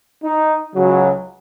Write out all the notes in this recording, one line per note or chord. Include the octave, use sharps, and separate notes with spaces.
D#4
C#2 C#3 F#3